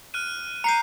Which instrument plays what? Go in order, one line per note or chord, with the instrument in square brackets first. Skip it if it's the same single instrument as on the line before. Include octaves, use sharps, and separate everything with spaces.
[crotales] F6 F#6 D#7
[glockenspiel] A#5 D#7 [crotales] G6 C7 C#7